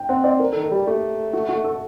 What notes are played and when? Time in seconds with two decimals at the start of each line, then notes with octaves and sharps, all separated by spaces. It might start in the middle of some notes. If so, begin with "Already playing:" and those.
Already playing: G5
0.09 C4 F#5
0.24 C4 D5
0.39 A#4
0.52 A4
0.56 D#3
0.64 A4
0.71 G3 G4
0.87 A3 G4
1.33 F#4
1.49 F#4
1.64 A4